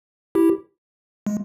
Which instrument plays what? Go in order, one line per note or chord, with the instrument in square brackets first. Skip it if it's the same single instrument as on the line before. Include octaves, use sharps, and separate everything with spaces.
[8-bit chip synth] E4 G4
G#3